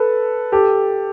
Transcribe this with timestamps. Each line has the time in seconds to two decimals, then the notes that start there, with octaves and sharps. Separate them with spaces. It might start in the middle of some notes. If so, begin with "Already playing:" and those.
Already playing: A4 B4
0.52 G4 A4